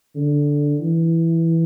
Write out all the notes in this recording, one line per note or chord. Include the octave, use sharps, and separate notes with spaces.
D3
E3